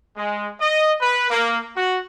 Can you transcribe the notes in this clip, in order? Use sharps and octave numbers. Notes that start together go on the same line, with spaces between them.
G#3
D#5
B4
A#3
F#4